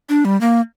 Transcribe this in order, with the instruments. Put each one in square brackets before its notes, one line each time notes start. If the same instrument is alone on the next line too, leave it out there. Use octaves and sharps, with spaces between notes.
[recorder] D4
G3
A#3